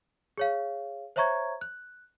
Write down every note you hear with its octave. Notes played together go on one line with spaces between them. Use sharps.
G#4 C#5 F5
C5 C#5 E5 A#5 C#6 G#6
F#6